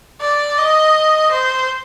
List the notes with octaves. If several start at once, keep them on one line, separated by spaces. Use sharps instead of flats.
D5
D#5
C5